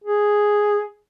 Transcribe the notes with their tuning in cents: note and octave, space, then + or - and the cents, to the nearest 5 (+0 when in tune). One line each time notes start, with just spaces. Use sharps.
G#4 +0